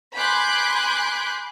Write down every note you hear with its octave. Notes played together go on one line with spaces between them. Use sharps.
G#5 B5 C6 D6 F#6 G6